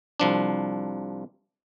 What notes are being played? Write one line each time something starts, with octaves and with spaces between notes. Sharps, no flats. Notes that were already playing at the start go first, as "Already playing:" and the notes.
C2 F3 D4